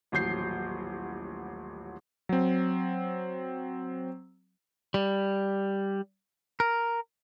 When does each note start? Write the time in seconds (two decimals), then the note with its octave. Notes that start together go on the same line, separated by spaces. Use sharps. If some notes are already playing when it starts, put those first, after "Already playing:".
0.12 D#1 A1 F#3 G6 C7
2.29 F#3 C4
4.94 G3
6.60 A#4